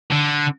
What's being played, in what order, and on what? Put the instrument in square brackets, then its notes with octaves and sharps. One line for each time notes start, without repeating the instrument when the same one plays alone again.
[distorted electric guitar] D3